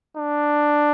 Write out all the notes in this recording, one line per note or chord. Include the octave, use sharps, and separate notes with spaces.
D4